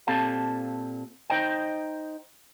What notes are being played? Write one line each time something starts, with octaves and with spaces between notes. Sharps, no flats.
A#2 C4 G4 A4 F5 A5
D#4 C5 D#5 G5